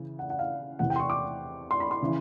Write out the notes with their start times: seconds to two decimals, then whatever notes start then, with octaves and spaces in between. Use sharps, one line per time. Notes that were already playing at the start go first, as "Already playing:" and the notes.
Already playing: C#3 E3
0.19 F#5
0.30 F#5
0.39 F5
0.79 E2 C3 E3 F#5
0.90 G5
0.96 C6
0.99 C#6
1.10 D6
1.71 C6
1.80 B5
1.91 C6
2.02 C#3 E3